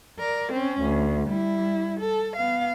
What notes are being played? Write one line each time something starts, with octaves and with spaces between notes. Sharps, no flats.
A#4 D5
C4 C#4
D2
G3 E4
A4
B3 F5